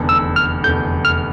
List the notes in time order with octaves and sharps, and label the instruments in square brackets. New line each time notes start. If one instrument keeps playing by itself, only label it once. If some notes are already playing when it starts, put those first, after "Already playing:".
Already playing: [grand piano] F1 E2 D3
[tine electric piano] E6
F6
[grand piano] F1 E2 D3 [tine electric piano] G6
[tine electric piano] F6